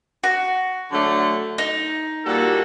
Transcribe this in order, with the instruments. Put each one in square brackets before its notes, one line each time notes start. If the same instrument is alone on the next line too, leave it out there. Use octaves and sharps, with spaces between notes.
[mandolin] F#4
[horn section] D3 F#3 A3 D4
[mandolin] D#4
[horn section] A#2 G3 A#3 F#4 A4